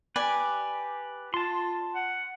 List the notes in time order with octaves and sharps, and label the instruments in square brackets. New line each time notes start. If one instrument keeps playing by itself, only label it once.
[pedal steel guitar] G4 B4 [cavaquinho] D5 G#5
[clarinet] F4 [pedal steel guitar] A5 C6
[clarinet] F#5